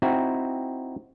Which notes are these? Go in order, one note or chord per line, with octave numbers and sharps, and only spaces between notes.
C4 D#4 E4 F#4